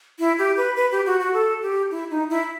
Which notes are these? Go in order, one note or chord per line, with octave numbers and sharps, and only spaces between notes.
E4
G4
B4
B4
G4
F#4
F#4
A4
G4
E4
D#4
E4